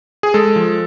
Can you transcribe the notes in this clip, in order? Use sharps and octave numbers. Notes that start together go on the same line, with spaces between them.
G#4
G#3 A4
F3